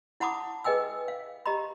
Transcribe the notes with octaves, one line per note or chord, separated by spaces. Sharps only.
E4 F#5 A5 B5 D6 D#6
G#4 B4 D#5 G5 G#5 E6
F5
G4 D#5 A#5 B5